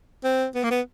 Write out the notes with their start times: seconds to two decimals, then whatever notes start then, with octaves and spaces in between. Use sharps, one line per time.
0.24 C4
0.55 B3
0.64 A#3
0.71 B3